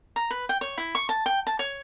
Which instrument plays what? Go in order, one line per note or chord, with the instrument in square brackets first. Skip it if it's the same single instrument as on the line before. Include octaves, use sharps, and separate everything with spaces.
[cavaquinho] A#5
B4
G5
C#5
E4
C#6
A5
G5
A5
C#5